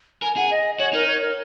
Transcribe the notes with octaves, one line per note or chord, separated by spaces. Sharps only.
A#4 G#5
G#4 F#5
D#5
F#4 C#5
D#4 A#4
C#5
A#4